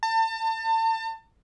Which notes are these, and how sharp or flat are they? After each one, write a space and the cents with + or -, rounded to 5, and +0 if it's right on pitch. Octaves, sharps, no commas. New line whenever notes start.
A5 +35